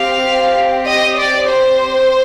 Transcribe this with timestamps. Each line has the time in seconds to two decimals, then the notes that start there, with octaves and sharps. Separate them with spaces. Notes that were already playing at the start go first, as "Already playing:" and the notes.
Already playing: C4 G4 F5
0.87 D#5
1.18 D5
1.49 C5